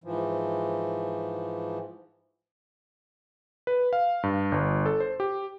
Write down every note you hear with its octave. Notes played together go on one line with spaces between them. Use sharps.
G#2 E3 F3
B4
F5
G2
G1
A4
C5
G4